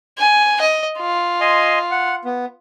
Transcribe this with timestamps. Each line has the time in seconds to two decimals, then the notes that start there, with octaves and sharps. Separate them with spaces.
0.19 G#5
0.61 D#5
0.99 F4
1.41 D#5 G#5 C6
1.91 F#5
2.25 B3